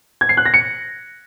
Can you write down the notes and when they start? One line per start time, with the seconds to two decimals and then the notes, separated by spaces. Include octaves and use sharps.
0.21 G#6
0.29 C7
0.37 F#6
0.46 A#6
0.54 C#7